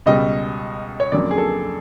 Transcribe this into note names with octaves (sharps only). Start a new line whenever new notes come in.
C#2 B2 G3 D#5
C#5
F2 D3 F#3 A#3 C#4 D5
G#4
A4